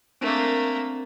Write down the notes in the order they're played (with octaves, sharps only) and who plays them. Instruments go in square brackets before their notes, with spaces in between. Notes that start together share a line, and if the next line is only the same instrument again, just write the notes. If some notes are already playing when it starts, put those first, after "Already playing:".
[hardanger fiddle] A3 A#3 [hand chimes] C4 D4 A#4